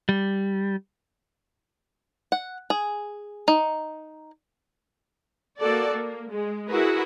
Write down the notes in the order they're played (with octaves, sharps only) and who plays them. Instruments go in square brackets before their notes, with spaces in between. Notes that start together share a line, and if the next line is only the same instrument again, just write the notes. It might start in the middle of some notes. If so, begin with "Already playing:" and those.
[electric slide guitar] G3
[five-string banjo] F#5
G#4
D#4
[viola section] A#3 F#4 A4 D5
A#3
G#3
E4 F#4 G#4 A#4 B4